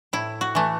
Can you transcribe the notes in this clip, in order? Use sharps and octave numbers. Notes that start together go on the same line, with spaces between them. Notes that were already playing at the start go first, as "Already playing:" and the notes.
A2 E4
F#4
E3 A3